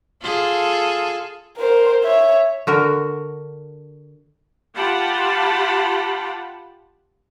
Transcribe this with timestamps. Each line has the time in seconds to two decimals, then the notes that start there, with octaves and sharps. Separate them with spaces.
0.22 F4 G#4 A4
1.57 A#4 C5
2.03 C#5 E5
2.67 D3 F#4 A#4
4.75 F4 G4 F#5 A5 B5